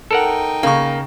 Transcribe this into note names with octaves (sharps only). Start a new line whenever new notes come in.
D#4 A4 A#4 F#5 G5
C#3 A#3 C#6